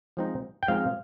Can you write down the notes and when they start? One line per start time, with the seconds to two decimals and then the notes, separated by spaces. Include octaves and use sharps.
0.17 F3 G#3 C4 D#4
0.63 G5
0.68 F3 G#3 C4 D#4 F5